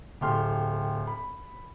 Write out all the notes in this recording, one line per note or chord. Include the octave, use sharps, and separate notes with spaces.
D1 G4 A4 C6 F6
B5